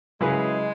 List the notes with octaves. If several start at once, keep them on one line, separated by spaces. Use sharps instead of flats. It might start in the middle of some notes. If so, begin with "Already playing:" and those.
C#3 F#3 G#3 E4 G#4 B4